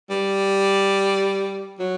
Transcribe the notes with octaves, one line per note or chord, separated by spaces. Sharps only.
G3
F#3